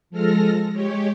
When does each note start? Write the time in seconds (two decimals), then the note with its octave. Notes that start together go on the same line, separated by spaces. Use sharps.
0.10 F3 G#3 A4 F6 A#6
0.73 G#3 G4 C#5